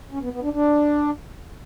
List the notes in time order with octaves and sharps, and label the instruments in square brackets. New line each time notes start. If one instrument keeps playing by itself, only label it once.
[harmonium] C#4
B3
B3
D4
D4